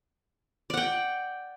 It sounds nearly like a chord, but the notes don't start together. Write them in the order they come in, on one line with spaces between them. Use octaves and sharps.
D5 F#5 G5